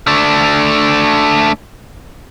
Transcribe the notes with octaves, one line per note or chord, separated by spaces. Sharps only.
A3 D4